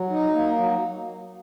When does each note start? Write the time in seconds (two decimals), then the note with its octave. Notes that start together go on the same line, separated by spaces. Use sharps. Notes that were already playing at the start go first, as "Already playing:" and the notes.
Already playing: F#3
0.10 D#4
0.33 A#3
0.57 F#3